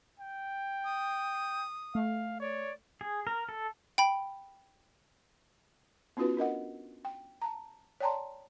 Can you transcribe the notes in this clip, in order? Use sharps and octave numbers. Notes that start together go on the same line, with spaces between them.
G5
D#6
A3 F5
C#5 D5
G#4
A#4
A4
G5 B5
B3 C#4 D#4 F4 F#4 B4
D4 A#4 D#5 F#5
G5
A5 A#5
C#5 D5 G5 A5 A#5 C6